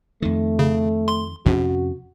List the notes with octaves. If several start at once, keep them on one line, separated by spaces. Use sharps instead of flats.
F2 D#3 A3
C#3
C6
A#1 F2 C3 C#4 F#4